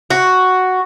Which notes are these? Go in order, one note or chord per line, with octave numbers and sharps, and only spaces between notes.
F#4